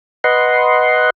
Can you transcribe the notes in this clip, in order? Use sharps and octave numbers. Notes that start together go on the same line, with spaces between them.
B4 D#5 F#5 C6